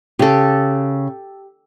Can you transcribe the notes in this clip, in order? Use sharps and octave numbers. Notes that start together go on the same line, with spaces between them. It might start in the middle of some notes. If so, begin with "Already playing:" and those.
C#3 G4 A4